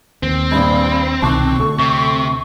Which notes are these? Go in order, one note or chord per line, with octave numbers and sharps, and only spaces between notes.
D#2 C4
A#1 G2 B5
C2 B2 D#3 A5 C#6 D6 F#6
D2 A4
C3